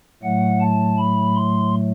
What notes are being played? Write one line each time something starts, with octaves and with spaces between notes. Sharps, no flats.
A2 F#3 A3 F#5
A5
B5
C6